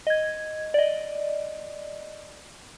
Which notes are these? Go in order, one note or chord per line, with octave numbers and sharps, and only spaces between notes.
D#5 G#6
D5 D#5